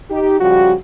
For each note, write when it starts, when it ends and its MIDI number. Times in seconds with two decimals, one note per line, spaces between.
0.10 0.38 63
0.10 0.38 67
0.40 0.73 49
0.40 0.73 53
0.40 0.73 55
0.40 0.73 66